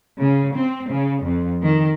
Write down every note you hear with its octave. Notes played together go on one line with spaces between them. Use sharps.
C#3
C4
C#3
F2
D#3